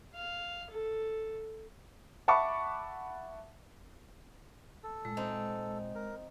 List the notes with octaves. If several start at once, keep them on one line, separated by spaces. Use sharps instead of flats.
F5
A4
E5 F#5 A5 B5 C#6 D6
A4
A#2 G#3
C4 D#4
A#4